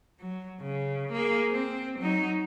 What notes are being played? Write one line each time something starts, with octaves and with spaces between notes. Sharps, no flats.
F#3
C#3
A#3 G#4
C4
F#3 D#4